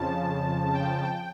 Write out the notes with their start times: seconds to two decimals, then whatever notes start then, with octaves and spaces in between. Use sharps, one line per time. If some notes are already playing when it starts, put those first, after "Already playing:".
Already playing: F2 C#3 F3 A5
0.74 G5
1.03 G5